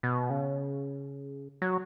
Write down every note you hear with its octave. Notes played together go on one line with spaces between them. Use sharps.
B2
C#3
F#3